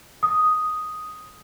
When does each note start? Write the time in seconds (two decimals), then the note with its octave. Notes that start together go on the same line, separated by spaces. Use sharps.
0.23 D#6